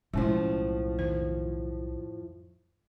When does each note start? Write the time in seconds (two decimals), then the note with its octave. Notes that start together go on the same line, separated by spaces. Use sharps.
0.13 B1 A2 F3 G#3 C#4 E4
0.99 F2 D#3 C5